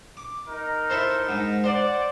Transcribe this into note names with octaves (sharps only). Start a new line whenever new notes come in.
D6
D#4 A#4
E4 A4 C5
G#2
C5 D5 F#5